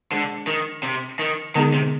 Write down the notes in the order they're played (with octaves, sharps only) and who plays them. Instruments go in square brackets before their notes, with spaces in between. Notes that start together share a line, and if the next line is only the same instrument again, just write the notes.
[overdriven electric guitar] D3 [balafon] G#3 D4 G#4 C5
[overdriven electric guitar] D#3
C3
D#3
[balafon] D3 G#3 B3 D#4 G#4 [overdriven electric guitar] D#3
[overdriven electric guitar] C3